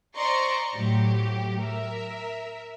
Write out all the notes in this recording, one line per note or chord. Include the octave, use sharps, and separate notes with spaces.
C5 D5 D#5 A#5 C6 C#6
A2 F#3 G4
A#4 E5